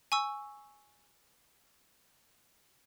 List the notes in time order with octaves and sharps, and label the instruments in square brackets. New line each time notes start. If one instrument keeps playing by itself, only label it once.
[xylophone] G#5 C#6 E6